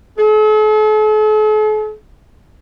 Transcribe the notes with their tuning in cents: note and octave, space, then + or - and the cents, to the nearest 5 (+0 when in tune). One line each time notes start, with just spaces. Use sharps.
A4 -45